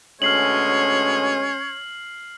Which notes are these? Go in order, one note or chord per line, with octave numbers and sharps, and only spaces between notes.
D2 B2 G#3 C#4 C#5 F6 C7 F#7